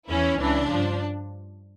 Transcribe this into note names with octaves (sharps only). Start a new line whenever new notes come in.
E2 E3 C#4 E4
C#2 C#3 E3 D4
G2 F3